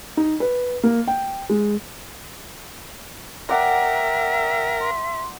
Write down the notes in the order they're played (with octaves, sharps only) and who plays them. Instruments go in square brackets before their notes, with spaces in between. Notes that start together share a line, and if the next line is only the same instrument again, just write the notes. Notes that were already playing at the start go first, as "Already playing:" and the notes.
[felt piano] D#4
B4
A#3
G5
G#3
[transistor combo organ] A#4 [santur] D5 F#5 A#5 [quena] E5 [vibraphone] G5
[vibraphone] C6